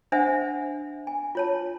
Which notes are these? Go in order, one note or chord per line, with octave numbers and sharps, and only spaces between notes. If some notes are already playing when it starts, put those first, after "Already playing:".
D4 C5 E5 F#5 G#5
G#5
F4 C#5 A5